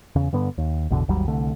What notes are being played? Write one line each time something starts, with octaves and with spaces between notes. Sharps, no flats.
E2 C#3
G2 D3 B3
D#2
A1 E2 B2 D3
G#1 D#2 F#3 G3
C2 D3 A3